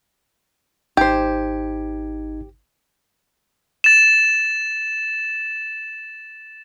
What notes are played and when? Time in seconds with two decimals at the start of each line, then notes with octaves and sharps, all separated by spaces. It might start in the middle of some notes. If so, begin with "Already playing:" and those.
0.97 G#1 D#4 G4 C5 G#6
3.84 A6 E7